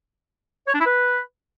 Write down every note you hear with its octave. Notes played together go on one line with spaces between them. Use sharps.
C#5
D4
E4
B4